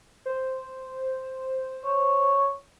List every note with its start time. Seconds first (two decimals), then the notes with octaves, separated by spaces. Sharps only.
0.26 C5
1.84 C#5